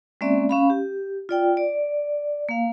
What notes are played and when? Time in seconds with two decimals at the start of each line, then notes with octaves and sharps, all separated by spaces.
0.21 G#3 A#3 C4 C#4 D5 E5
0.49 C#4 F5 B5
0.70 G4
1.29 F4 D5 G5
1.57 D5
2.49 A#3 F5